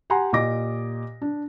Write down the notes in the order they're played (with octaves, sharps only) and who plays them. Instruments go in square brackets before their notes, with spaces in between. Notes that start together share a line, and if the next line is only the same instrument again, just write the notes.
[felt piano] G4 F#5 G#5 A#5 C6
A#2 G4 D#5 D6 A#6
D4